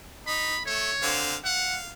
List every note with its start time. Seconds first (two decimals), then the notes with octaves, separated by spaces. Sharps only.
0.27 D#4 B5
0.66 A3 C#5
1.03 D3 C4 F5
1.45 F5 F#5